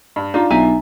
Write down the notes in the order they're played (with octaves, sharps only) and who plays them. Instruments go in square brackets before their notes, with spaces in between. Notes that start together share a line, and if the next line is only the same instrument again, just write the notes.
[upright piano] G2
[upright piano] D4 F4 [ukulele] D#4
[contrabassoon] B1 [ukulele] D#4 E5 G#5